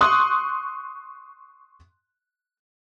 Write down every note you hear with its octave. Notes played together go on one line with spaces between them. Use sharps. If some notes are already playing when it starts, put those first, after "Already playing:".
C6 C#6 D#6 F#6